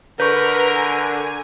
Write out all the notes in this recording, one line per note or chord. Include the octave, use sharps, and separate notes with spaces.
D3 A#4 B4 C#6 G6
G#5